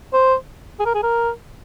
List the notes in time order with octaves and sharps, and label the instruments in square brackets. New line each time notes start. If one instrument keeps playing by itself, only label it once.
[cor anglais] C5
G#4
A#4
G#4
A#4